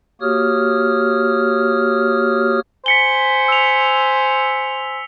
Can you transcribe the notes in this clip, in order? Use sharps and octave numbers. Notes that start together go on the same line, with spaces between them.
A#3 F#4 G4 C#5 D#6 F6
C5 G#5 B6 C#7 G7
E6 F7